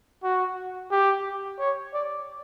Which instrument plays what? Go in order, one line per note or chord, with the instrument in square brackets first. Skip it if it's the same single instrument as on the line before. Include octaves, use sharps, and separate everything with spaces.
[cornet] F#4
G4
C#5
D5